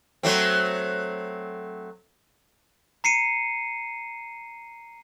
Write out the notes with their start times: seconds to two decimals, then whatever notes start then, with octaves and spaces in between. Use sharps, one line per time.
0.23 F#3 A3 C4
3.04 A#5 C7 C#7 D#7